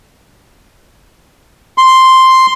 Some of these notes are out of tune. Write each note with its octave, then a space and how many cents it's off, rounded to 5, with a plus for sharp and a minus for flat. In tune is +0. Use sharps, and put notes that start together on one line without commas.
C6 +0